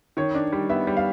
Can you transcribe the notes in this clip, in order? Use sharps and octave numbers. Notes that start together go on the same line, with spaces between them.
D#3 C#5
D4
G3
B3 E5
G3
F5